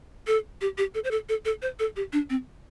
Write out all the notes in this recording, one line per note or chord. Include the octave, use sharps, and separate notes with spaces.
A4
G4
G4
A4
C5
A4
A4
A4
C5
A4
G4
D4
C4